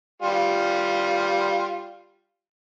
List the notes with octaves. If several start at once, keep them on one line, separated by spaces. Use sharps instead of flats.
G3 F4